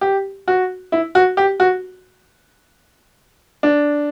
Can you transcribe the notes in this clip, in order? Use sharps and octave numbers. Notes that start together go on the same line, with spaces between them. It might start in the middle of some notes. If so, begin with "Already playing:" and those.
G4
F#4
E4
F#4
G4
F#4
D4